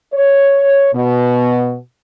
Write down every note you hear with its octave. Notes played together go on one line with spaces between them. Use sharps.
C#5
B2